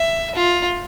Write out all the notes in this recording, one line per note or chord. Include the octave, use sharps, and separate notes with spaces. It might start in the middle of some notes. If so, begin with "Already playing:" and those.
Already playing: E5
F4